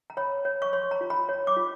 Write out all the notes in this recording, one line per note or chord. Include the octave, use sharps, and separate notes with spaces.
A#5
C#5 B5
C#5
C#6
C#5 C6
A#5
F4
B5
C#5
D6
F4